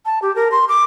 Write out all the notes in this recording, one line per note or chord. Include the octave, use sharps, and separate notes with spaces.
A5
G4
A#4
C6
D6